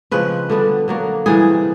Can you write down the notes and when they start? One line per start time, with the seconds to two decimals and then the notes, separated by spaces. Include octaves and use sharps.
0.11 C#3 F3 G#3 C4 B4
0.50 D3 G3 B3 D4
0.88 D3 F#3 A#3
1.26 C3 E3 G3 G#4